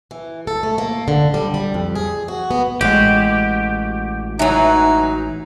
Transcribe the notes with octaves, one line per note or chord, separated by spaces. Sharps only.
E3
A4
A3
A#3
D3
G3
G3
F2
G#4
F#4
B3
A1 G#3 F#4 G4
E3 F#3 D#4